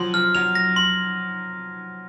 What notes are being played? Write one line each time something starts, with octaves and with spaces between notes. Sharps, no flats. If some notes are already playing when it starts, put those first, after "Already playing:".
Already playing: F3 F#3 C6
F3 F6
F#3 F7
A#6
C6